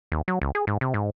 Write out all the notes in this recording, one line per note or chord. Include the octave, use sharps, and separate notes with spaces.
D#2
F#3
C#2
G#4
G#2
C3
G#2